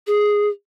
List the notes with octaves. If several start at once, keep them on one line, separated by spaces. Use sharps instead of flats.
G#4